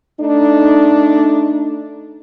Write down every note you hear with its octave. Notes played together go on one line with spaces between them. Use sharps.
A3 D4 D#4